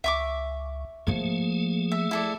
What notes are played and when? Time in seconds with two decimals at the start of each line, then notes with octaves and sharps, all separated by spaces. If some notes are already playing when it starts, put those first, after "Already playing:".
0.04 C#2 E5 C#6 D6
1.07 F3 A3 A#3 G#4
1.92 E5
2.11 E4 A4 D5